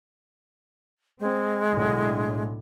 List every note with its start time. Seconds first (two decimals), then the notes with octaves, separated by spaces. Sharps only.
1.20 G#3 C4
1.72 B1 A2 D3